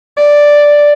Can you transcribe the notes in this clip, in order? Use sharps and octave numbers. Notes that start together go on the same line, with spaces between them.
D5